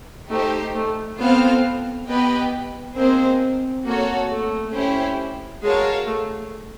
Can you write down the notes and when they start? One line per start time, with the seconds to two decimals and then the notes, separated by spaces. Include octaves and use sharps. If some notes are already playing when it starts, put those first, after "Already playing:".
0.30 A3 D#4 G4 C5
0.75 A3
1.19 B3 C4 F4 A4 C5 F5
2.08 B3 G4 B4 D#5 G5
2.96 A#3 C4 D#4 G#4 C5
3.85 A#3 F#4 A4 C#5
4.30 A3
4.73 C#4 E4 G4 C5
5.63 G#3 F#4 A#4 C#5 F5 A5
6.07 A3